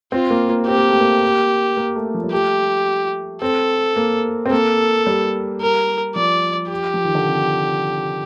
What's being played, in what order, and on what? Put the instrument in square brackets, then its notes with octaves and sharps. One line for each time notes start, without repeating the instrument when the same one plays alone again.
[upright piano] C4 [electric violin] F4
[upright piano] A#3
A#3
[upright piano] C4 [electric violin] G4
[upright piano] A#3
A3
A#3
A#3
A3
F3
G3
[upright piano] A3 [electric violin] G4
[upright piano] C4 [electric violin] A4
[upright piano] A#3
C4
[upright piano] A#3 [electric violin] A4
[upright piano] G3
[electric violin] A#4
[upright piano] F3 [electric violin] D5
[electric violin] G4
[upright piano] F3
D#3
D3
C3